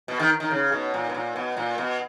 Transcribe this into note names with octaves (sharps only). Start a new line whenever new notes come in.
B2
D#3
D#3
C#3
B2
A#2
B2
A#2
B2
A#2
B2